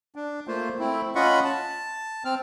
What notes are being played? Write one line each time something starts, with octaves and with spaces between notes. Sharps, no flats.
D4
A3 A#3 F4 C5
A3 C4 E4
C#4 F4 D#5 F#5 B5 C#6
A5
C4 F6